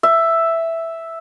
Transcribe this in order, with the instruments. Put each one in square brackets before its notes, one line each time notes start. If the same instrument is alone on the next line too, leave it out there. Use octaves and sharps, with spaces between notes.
[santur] E5